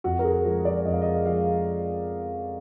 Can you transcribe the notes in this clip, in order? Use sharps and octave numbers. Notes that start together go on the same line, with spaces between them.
F2 F#4
A#4
G#4
F3 G#3
D5
F2 D#5
F5
D#5
F3 G#3 F5